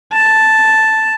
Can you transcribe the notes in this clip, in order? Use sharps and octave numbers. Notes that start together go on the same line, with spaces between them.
A5